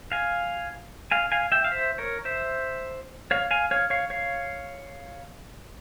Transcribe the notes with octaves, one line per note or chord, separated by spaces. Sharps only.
F5 G#5
F5 G#5
F5 G#5
E5 G5
F5
C5 E5
A#4 C#5
C5 E5
C#5 F5
F5 G#5
C#5 F5
C#5 F5
C#5 F5